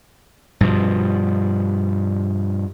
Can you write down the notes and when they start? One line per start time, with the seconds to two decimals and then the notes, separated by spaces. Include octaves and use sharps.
0.61 G2 B2 F3